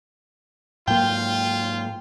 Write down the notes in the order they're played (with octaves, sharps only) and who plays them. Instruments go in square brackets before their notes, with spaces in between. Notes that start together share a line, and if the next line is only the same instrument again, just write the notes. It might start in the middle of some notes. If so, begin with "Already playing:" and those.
[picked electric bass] G#2 F#3 A#3 [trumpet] F4 [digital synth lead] G5